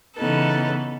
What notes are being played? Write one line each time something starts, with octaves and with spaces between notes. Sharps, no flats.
C#3 E3 B3 D#4 A4